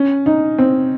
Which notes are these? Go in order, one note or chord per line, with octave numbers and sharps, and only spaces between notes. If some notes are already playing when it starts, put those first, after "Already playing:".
Already playing: C#4
D#4
C4